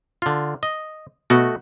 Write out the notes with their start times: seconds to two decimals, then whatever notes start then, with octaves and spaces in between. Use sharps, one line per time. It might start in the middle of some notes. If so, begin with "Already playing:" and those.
0.22 D3 F4
0.63 D#5
1.30 B2 A3 F#4 D#5